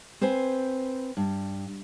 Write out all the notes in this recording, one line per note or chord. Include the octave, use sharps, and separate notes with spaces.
C4 B4 C5 G#5
G2